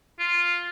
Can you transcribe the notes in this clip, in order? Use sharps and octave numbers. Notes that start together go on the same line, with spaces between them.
F4